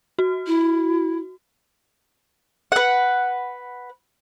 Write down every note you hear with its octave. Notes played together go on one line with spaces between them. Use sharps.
F#4
E4
B4 F#5